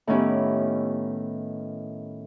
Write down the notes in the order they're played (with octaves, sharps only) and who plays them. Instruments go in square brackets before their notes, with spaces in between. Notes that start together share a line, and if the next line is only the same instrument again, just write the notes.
[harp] A2 D#3 B3 C#4 E4 G4